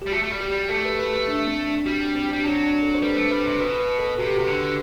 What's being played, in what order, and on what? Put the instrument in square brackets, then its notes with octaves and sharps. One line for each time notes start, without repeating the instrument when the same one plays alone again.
[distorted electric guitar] G3 [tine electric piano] G4
[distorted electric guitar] A3 [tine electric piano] F#4
[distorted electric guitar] A3
G3
[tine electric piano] G4
[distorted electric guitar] G3
[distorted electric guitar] A3 [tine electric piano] A4
[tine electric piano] B4
B4
A4
D4
C4
D4
[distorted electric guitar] G3 [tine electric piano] F#4
[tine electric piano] D4
C4
[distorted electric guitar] G3 [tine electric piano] D4
[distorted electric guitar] F#3 [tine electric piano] D4
[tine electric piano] C4
D4
A4
C5
[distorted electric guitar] G3 [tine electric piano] B4
[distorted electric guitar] A3
[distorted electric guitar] G3 [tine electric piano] B4
[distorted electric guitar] C3
[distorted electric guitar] B2 [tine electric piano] B4
[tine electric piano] B4
A4
[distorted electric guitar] C3 [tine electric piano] F#4
[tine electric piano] G4
[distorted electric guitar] C3 [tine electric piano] F#4
[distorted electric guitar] D3